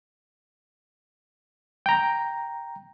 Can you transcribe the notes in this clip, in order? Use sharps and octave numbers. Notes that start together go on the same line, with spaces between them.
G5 A#5